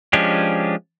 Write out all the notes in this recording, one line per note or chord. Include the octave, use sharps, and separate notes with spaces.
F3 G#3 C#4 D4 G4